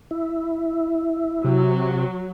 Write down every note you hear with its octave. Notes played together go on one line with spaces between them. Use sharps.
E4
C3 F#3